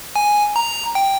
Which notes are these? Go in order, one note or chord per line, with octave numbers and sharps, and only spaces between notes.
G#5
A#5
G5